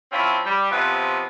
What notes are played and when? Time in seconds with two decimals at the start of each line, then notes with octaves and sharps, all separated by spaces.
0.13 F3 C4 C#4 E4 F4
0.45 G3
0.71 C3 F3 F#3 B3 B4